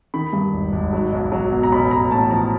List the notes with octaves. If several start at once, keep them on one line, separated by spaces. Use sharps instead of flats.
D#3 B5
G2
G#1
G#1
F#3
B1
F#3
B2
A#5
A1 B5
A1 A#5
A2 A5
F3 A#5